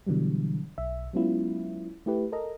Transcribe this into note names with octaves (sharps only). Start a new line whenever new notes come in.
B2 D3 E3 F#3 G3
B1 E5
F#3 G#3 B3 C#4 E4 F4
A3 E4 G4 B4
A4 A#4 D#5 A#5